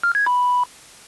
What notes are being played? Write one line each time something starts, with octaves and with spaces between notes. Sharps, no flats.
F6
G#6
B5